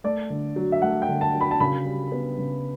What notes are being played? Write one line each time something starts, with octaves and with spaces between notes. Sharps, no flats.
A3 D5
D3
F#3
E5
A3 F#5
G5
D3
A5
F#3
B5
A5
C#3 B5
G3
B3
C#3